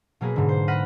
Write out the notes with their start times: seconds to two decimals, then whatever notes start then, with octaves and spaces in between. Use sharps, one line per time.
0.21 B2 F#3 A#3 G#4 B4
0.36 G#2 D3
0.49 C5
0.68 F#5 B5 F6 A#6 B6 D#7